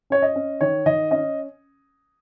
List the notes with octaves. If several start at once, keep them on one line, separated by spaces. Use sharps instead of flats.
C#4 C#5
D#5
C#4
D#3 C#5
D#3 D#5
C#4 D#5